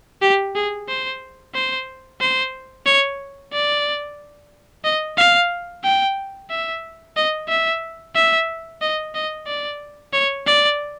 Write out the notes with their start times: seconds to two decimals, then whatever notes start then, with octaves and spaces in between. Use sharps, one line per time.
0.22 G4
0.55 G#4
0.89 C5
1.55 C5
2.21 C5
2.86 C#5
3.53 D5
4.84 D#5
5.18 F5
5.84 G5
6.50 E5
7.17 D#5
7.49 E5
8.15 E5
8.82 D#5
9.15 D#5
9.47 D5
10.13 C#5
10.47 D5